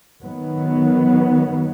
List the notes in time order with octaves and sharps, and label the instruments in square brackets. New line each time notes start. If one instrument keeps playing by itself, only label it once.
[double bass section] D#3 F#3 B3